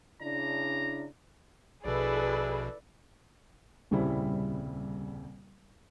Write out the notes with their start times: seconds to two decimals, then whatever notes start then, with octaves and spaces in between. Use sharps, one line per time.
0.21 C#3 D4 E4 A#5
1.85 A#1 B2 E4 G#4 A4 B4 D5
3.91 D#1 C2 C#3 G3 C4 E4